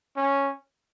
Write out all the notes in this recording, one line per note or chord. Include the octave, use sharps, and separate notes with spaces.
C#4